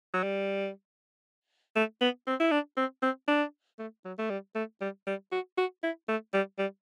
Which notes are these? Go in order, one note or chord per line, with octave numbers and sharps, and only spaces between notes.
F#3
G3
A3
B3
C4
E4
D4
C4
C4
D4
A3
F#3
A3
G3
A3
G3
G3
F#4
F#4
E4
A3
G3
G3